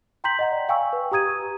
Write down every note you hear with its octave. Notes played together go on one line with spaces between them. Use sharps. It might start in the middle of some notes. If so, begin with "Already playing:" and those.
G5 A#5 C6 G6 B6 F#7
D#5 F#5 A#5
D5
F5 G5 G#5 C#6 E6
B4
G4 A#5 D#6 G#6 D#7